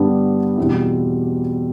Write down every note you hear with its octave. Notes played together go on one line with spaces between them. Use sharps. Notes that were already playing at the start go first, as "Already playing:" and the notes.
Already playing: G2 D3 G3 B3 D4
E2 B2 G3 C4 E4